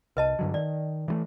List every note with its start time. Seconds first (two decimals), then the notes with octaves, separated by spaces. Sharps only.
0.17 C2 B4 D#5 A5
0.39 G2 D3 F#3
0.54 D#3 D5
1.08 E3 F3 A3